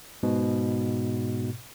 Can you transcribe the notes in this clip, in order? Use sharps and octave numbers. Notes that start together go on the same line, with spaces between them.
G#2 B2